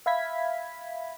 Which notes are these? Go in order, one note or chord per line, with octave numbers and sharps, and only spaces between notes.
E5 F5 B5 G#6 B6